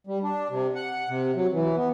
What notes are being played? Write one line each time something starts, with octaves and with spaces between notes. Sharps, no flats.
G3
D4
C3
F#5
C3
F#3
E3
B3